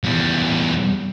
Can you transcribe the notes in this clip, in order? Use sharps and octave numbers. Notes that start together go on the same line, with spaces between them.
E2 G3